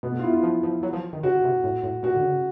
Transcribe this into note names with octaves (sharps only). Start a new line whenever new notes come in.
B2 B3
B3
F4
E4
F4
F3
F3
F#3
F3
D#3
C#3 F#4
C3
A2
A2
A#2 F#4
D3
C#3